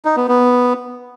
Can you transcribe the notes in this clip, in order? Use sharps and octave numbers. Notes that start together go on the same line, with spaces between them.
D#4
B3
B3